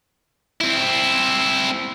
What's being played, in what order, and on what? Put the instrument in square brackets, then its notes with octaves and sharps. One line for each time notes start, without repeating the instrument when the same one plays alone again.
[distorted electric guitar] C4 E4